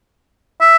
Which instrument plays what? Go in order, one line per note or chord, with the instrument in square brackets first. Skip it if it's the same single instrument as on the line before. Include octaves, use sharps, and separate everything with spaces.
[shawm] E5